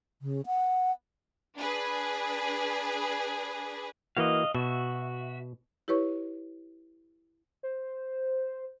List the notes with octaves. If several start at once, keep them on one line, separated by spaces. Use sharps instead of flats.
C#3
F#5
D4 G#4 B4
E3 A#3 F#4 D#5 F5
B2 F#4 E5
E4 G4 B4 C#5 C#6
C5